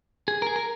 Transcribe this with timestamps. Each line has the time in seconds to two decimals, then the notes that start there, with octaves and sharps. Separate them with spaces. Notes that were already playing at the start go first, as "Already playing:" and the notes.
0.28 G#4
0.42 A#4
0.47 G#4
0.56 A#4